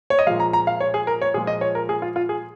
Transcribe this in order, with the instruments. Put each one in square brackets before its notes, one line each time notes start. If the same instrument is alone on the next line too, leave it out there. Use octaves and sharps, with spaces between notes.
[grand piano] C#5
D#5
A#2 F3 G#3 F5
A#5
A#5
F5
C#5
G#4
A#4
C#5
A#2 F3 G#3 G#4
D#5
C#5
A#4
G#4
F4
F4
G#4